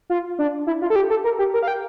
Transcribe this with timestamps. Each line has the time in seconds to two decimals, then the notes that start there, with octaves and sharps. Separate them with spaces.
0.10 F4
0.39 D4
0.67 E4
0.82 F4
0.90 A4
0.96 G4
1.10 A4
1.24 A#4
1.39 G4
1.54 A#4
1.63 F5
1.68 G5